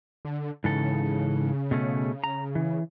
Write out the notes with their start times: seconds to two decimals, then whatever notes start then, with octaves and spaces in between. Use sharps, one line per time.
0.25 D3
0.64 G#2 C#3 E3 A4
1.71 B2 A3 C#4
2.24 A#5
2.55 E3